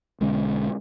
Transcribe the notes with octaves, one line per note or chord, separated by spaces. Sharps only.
B1 D3 G#3 C#4